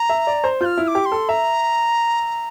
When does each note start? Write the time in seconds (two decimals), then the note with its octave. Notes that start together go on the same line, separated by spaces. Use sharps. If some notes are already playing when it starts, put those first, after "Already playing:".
Already playing: A#5
0.10 E5
0.27 D5
0.44 C5
0.61 F4 G6
0.65 F6
0.77 E4
0.83 F6
0.88 D6
0.95 G4
1.06 C6
1.12 A4
1.29 E5 A#5